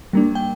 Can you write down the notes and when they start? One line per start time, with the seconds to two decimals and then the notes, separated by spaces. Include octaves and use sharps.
0.13 G3 A#3 D4
0.35 G5